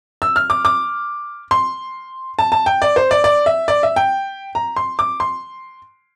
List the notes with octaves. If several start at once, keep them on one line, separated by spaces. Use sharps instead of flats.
E6
F6
D6
D6
C6
A5
A5
G5
D5
C5
D5
D5
E5
D5
E5
G5
A#5
C6
D6
C6